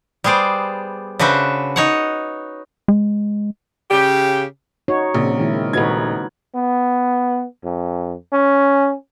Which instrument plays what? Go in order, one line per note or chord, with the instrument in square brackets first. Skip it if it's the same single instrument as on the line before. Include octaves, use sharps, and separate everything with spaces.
[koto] G3 B3 G#4 C5 D5
C#3 D4 F#4 B4 C5 E5
D#4 C#5 F#5
[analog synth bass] G#3
[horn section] C#3 G4
[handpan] D#4 F#4 C#5
[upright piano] A#1 [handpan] C#3 C4
[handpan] D#3 G#3 E4
A#4
[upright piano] D#1 G#6 [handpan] D#4 F#4 B4
[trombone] B3
F2
C#4